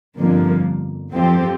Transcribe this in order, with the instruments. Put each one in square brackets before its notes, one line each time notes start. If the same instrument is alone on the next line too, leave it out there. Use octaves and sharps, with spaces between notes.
[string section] G1 F2 D3 F3 A#3
F2 F3 C4 G4